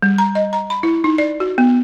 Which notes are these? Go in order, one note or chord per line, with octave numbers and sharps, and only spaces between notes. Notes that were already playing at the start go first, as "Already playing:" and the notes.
G3
A#5
D#5
A#5
B5
E4
D#4
D5
F#4
B3